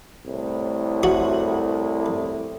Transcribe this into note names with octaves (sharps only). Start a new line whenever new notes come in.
C2 A2
F#4